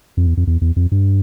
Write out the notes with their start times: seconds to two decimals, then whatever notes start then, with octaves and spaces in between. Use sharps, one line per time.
0.17 F2
0.27 E2
0.37 F2
0.47 E2
0.61 E2
0.76 F2
0.92 G2